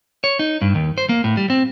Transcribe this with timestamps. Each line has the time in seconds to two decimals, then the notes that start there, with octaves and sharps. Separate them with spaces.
0.24 C#5
0.39 D#4
0.61 G2
0.75 D#2
0.98 C5
1.09 A#3
1.24 A2
1.37 G3
1.50 C4